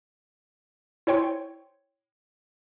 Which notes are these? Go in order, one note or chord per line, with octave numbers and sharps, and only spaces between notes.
E4 C5 C#5 G5 C6